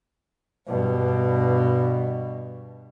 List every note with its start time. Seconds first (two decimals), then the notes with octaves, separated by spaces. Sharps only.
0.67 G2 B2